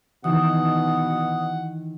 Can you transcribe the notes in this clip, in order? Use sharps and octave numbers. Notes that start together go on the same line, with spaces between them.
B2 D#3 E3 F#4 F#5 D#6